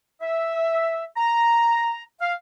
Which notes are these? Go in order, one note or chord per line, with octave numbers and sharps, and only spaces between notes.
E5
A#5
F5